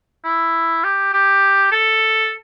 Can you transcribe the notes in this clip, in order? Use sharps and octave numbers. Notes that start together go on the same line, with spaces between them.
E4
G4
G4
A4